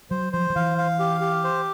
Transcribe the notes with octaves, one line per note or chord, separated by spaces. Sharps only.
F#3 C5
F3 C5
F3
E3 F5
F5
G4
G4
C5